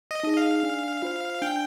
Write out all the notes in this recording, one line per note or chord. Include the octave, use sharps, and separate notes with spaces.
D#5
D#4 G#4
F5
D4
F4 C5
D4 G5